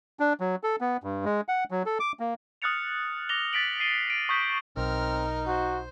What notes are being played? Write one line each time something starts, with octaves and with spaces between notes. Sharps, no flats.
D4
F#3
A4
B3
G2
G#3
F#5
F#3
A4
D6
A#3
D#6 F6 F#6 A6 C#7 F7
D6 A#6 F7 G7
A6 B6 D7 F#7
C7 D#7 G7
D7
C#6 D#6 G6 B6
B1 C4 D#4 A#4 F6
F#4 C5